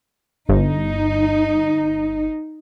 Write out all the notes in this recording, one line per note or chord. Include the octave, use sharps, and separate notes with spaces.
G1 D#4